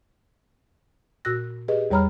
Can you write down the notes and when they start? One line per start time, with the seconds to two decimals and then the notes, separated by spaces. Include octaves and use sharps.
1.25 A#2 F#4 E6 F#6 A#6
1.68 G4 G#4 B4 D#5
1.91 E2 G3 C#5 A#5 B5 F6